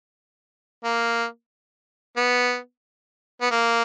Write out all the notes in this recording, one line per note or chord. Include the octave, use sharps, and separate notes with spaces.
A#3
B3
B3
A#3